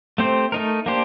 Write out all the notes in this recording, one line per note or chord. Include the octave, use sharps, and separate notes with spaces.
A3 C4 G4 C5
A3 D#4 A#4
A#3 D4 G4 C5